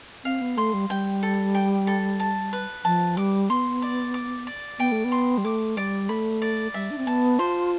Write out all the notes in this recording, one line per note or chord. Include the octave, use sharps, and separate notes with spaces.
C4 F5
B3
A3 C6
G3
G3 G5
A4
G5
A4
A5
B4
F3 A5
G3 D6
B3 C6
D5
D6
D5
B3 G5
A3
B3
C6
G3
A3 D6
G3 D5
A3 B5
D5
G3 E5
D4
C4
B3 A5
F4 C5